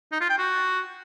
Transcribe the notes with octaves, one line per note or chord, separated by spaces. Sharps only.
D#4
F4
G5
F#4